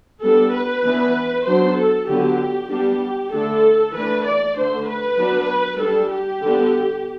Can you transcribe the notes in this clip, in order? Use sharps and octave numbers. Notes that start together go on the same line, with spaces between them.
G3 B3 D4 A4
B4
E3 B3 D4
F#3 B3 D4 C5
A4
D3 F#3 B3 D4 G4
G3 B3 D4 G4
D3 A3 D4 A4
E3 A3 D4 B4
D5
D3 A3 D4 C5
B4
F#3 B3 D4
G3 D4 A4
G4
D3 G3 B3 D4